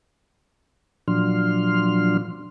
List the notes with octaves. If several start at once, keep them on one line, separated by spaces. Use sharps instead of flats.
A#2 F3 F#3 D4 C6 F6